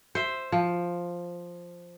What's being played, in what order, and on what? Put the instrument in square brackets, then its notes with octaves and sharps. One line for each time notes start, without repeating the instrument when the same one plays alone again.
[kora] C5 E5
F3